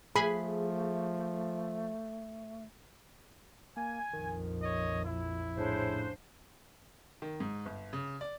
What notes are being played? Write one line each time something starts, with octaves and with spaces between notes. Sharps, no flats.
F3 A3 G#4 B5
A#3 G#5
A#1 F2 D#3
C#5 D#5
E4
A2 C#3 D4 C5
D#3
G#2
G1
C#3
D5